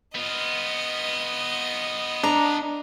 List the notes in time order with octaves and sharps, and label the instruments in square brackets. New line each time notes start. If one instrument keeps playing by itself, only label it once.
[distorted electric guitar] B3 F4 [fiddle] D#5
[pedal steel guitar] D4 [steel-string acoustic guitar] A#5